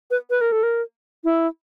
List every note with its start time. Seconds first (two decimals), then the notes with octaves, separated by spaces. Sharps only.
0.11 B4
0.30 B4
0.41 A#4
0.52 A4
0.63 A#4
1.24 E4